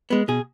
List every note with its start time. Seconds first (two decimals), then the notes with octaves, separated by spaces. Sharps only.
0.10 G#3 B3
0.28 B2 G#4